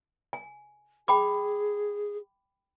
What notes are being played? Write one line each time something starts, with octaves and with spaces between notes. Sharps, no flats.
G#5
G#4 G5 B5 D6